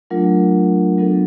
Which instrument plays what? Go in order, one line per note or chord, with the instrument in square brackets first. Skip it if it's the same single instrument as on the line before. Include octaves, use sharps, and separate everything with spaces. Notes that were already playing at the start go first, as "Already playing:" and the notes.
[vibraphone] F#3 A3 D4 F4 A#4
F#3 B3 D4 F4 A4